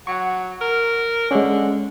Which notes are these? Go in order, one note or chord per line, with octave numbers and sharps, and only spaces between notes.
F#3 F#5 C#6
A#4
D3 G#3 C#4